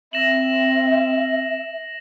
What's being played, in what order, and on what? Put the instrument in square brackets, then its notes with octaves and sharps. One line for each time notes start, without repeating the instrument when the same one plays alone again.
[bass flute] C4 [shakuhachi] E5 [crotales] A#6 E7 F#7